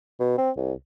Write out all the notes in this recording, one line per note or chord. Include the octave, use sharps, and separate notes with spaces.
B2
C4
C2